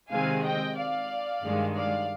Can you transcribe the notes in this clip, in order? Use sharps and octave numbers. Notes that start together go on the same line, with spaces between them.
C3 D#3 G#3 C4 F5 G#5
D#5 G5
D5 F5
G2 D#3 G#3
D5 F5